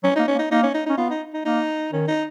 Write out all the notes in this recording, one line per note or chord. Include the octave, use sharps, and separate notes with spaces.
F#3 C#4
A#3 D#4
C#4
A#3
D#4
A#3 D#4
C#4
D#4
C#4 D#4
B3 F4
D#4
D#4
A#3 D#4
D#3 C#4
D#4